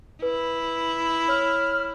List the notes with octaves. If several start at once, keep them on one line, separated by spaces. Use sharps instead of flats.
E4 B4
C#5 F6